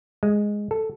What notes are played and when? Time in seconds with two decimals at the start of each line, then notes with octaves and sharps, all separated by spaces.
0.23 G#3
0.71 A4